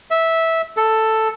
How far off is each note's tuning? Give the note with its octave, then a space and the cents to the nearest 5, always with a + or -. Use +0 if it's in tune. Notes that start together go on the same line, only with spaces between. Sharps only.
E5 -10
A4 +5